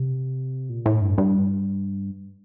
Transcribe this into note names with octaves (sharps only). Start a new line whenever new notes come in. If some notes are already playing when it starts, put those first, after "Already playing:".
Already playing: C3
A#2
A2
G2
G2